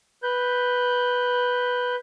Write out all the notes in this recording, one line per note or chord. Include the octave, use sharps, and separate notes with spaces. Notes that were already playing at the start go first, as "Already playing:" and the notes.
B4 G6